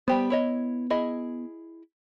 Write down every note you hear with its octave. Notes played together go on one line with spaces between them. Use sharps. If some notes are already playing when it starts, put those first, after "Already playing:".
G3 B3 G4 C5
E4 C#5 D#5
E4 G#4 D#5